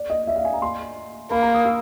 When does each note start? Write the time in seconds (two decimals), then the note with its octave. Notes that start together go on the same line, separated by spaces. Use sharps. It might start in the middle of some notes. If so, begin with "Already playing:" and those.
Already playing: D5
0.10 D#5
0.27 E5
0.36 F5
0.45 G#5
0.53 A#5
0.62 C6
1.31 A#3 B5
1.42 A#5
1.55 D#6
1.66 E6